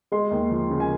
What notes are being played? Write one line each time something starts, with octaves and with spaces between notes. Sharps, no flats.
G#3 C6
D#2
F3
C#3
G#5